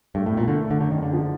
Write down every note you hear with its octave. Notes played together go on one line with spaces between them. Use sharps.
G2 A3
A2
B1
A#2
D3 A3
A3
D3
F#2 D3
D#3
F#1
D3
F3